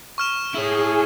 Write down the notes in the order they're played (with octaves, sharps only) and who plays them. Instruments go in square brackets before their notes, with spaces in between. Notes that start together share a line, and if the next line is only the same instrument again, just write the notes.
[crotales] C#6 F6 E7
[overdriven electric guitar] E4 C#5 [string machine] G#4